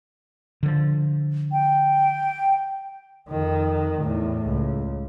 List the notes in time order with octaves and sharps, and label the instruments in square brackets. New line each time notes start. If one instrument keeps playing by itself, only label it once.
[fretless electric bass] D3 F3
[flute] G5
[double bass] F2 D#3
E2 A2
C#2